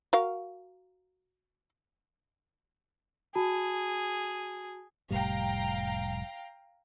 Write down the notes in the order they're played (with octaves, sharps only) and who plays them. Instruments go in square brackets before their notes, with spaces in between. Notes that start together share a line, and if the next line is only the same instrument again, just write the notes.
[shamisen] F#4 A#4 F5
[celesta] F#4 A5 B5 [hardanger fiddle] G#4
[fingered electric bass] F1 A2 G3 [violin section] F5 G5 A#5